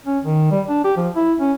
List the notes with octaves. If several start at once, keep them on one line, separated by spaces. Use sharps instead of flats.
C#4
D#3
G3
D4
G4
F3
E4
C#4